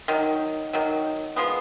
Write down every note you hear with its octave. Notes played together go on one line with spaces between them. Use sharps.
D#3 F#3
D#3 F#3
F3 G#3 B3